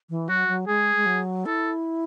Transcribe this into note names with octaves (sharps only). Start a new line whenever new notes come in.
E3
F#3 F#4
F#3
G#3 G#4
G#3
F#3
E4 A4